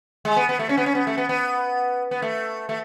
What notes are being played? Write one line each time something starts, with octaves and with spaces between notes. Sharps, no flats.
G#3
B3
B3
A3
C#4
B3
C#4
B3
A3
B3
B3
B3
A3
A3